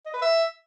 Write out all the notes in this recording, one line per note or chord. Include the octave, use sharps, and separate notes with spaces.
D#5
B4
E5